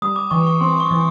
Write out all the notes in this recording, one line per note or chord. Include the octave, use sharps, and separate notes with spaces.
G3 D#6
D6
E3 C#6
C#6
C4 C6
C#6
E3